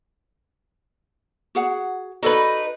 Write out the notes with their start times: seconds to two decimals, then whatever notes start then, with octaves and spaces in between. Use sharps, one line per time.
1.55 F#4 G#4 F#5
2.23 D#4 F#4 A4 B4 D#5